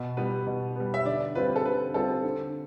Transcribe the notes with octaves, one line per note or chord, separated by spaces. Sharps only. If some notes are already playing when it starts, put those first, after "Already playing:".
Already playing: B2
G3 B3 B4
B2
G3 B3
E5
D3 D5
G3 C4 F4 B4
A4
D3 B4
G3 C4 F4 A4
D3